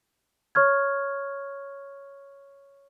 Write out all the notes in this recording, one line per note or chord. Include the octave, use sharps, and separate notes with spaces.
C#5 C#6 F6 G#6